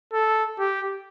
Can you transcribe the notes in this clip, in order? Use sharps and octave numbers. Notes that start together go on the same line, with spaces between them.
A4
G4